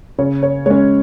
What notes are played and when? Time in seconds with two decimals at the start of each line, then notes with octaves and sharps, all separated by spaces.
0.19 C#3 C#5
0.43 C#5
0.66 G#3 C#4 C#5